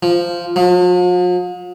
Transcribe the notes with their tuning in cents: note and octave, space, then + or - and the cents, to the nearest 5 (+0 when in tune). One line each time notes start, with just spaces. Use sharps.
F3 -10
F3 +45